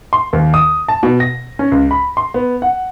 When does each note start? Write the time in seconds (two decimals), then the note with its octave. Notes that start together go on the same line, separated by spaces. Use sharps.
0.13 C6
0.33 D#2
0.54 D#6
0.88 A5
1.03 B2
1.20 A#6
1.59 C#4
1.72 C#2
1.91 B5
2.17 C6
2.34 B3
2.62 F#5